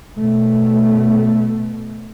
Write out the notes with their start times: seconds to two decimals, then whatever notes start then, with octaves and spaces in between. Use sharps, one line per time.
0.18 B2 A3